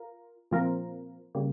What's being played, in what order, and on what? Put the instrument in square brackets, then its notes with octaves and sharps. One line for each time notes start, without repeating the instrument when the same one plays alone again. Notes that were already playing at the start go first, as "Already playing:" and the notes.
Already playing: [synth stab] F4 A#4
A#2 F3 C4 F4 A#4
C#3 G3 A#3